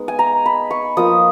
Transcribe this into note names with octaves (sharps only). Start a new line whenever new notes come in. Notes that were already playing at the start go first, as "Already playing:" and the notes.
Already playing: G#3 B3 D#4
G#5
A#5
B5
C#6
F3 A#3 F4 D#6